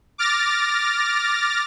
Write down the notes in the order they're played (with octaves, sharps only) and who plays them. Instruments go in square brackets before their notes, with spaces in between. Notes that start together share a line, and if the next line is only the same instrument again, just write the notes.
[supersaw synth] D6 F6 A6 A#6